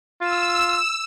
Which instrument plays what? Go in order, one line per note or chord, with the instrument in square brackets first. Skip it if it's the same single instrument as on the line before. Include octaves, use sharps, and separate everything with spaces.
[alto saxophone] F4 [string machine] E6